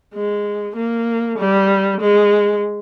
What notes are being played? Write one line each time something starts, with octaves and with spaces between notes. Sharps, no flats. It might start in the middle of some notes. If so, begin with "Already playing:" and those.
G#3
A#3
G3
G#3